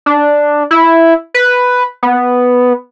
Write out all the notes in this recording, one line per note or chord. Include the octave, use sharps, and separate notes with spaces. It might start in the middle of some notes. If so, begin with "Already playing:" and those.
D4
E4
B4
B3